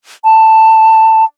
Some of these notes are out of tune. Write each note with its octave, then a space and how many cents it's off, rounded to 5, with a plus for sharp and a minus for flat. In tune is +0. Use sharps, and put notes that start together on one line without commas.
A5 +10